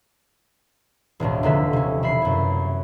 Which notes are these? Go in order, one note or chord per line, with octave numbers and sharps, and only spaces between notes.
E1 A1 D2 A2
F1 D#2 D3 E5
C3 C#4
E1 E5 B5 C7
F#2 E4